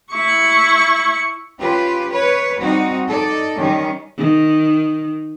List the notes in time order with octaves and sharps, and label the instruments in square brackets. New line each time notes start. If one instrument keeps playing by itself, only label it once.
[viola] E4 C#6
[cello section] C#4 F4 G4 B4
B4 C#5
G3 C4 D#4 F#4
D#4 A4 D5
D#3 G3 C#4
[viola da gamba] D#3